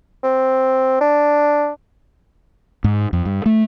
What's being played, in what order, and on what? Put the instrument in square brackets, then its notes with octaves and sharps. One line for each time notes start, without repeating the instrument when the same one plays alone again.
[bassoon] C4
D4
[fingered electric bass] G#2
F2
G2
A3